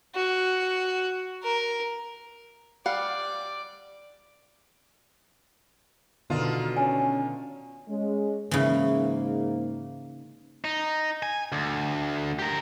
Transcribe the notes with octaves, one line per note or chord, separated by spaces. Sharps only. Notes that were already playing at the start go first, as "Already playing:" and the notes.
F#4
A#4
G3 D5 F5 F#5
B2 D3 D#3 B3 F4
C#4 G#5
G#3 C#4
G#2 C#3 E3 A#3
D#4
G#5
D2
G4 A#4